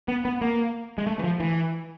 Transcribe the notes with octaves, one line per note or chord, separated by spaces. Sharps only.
B3
B3
A#3
G#3
A3
E3
F3
E3